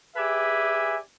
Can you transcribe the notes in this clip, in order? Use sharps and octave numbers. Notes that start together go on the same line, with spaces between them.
G4 G#4 B4 D5 E5 G#5